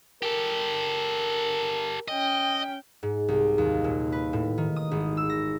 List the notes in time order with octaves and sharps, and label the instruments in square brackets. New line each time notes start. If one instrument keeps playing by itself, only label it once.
[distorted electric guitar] G4 A4 [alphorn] A#4
[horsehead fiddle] C#4 G5 [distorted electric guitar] D#5
[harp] G#2
C2
D#2
A#2
B4
A2
D#3
D#6
G#1
E6
A#6